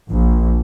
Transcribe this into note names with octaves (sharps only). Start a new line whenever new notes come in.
A#1